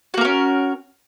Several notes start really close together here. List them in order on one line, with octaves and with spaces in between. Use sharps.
F#4 A#3 A#4 C#4